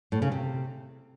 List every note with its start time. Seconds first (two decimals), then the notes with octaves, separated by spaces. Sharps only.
0.12 A2
0.22 C#3
0.32 C3